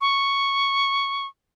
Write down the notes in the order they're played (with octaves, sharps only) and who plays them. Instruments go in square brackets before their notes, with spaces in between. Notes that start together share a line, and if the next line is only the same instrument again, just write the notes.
[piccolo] C#6